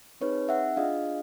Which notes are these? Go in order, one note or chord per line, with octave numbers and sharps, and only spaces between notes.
C4 D#4 G#4 B4 C#5
E5 F#5
D4 F4 G#4 D#5 F5